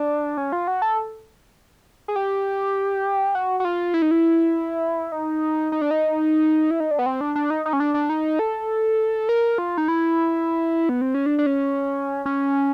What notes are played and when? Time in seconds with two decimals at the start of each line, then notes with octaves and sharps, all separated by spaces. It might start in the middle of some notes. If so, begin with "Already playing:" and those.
Already playing: D4
0.37 C#4
0.52 F4
0.67 F#4
0.82 A4
2.08 G#4
2.16 G4
3.35 F#4
3.60 F#4
3.65 F4
3.94 E4
4.02 D#4
4.11 E4
5.12 D#4
5.72 D#4
5.81 D4
5.91 D#4
6.71 E4
6.80 D#4
6.91 D4
6.99 B3
7.06 C4
7.21 D4
7.36 D4
7.50 D#4
7.66 D#4
7.73 C#4
7.80 D4
7.94 D4
8.09 D#4
8.39 A4
9.29 A#4
9.58 F4
9.78 D#4
9.88 E4
10.89 B3
11.01 C4
11.14 C#4
11.26 D4
11.39 D4
11.46 C#4
12.26 C#4